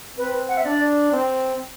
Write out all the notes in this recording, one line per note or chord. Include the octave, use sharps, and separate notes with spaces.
C4 B4
F#5
E5
D4 D5
C4